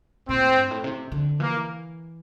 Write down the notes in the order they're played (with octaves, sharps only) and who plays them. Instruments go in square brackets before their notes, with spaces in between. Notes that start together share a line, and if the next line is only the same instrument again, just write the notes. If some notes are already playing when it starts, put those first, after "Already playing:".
[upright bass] A#2 [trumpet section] C4
[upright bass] A2
G2
A2
C3
D3
[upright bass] E3 [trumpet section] A#3